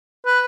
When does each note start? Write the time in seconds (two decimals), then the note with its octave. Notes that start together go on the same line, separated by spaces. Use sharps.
0.26 B4